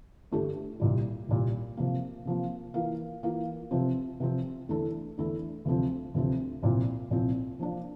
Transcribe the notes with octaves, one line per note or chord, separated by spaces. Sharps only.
G2 D3 A3 D4 G4
C2 A#2 G3
C2 A#2 G3
C3 F3 A#3
C3 F3 A#3
E3 A#3 F4 A#4 F5
E3 A#3 F4 A#4 F5
C3 F3 C4
C3 F3 C4
E2 D3 A3 E4 A4
E2 D3 A3 E4 A4
D2 C3 F3 C4
D2 C3 F3 C4
C2 A#2 F3 C4
C2 A#2 F3 C4
F3 A#3 D4